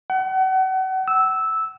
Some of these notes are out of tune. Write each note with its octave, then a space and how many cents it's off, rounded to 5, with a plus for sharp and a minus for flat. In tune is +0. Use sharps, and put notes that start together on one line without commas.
F#5 +35
E6 -10